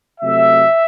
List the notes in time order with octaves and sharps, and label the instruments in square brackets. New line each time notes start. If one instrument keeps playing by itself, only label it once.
[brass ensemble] C3 F#3 A3 E5